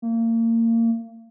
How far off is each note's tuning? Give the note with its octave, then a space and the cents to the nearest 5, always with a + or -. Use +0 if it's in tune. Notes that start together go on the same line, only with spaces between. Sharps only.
A#3 -30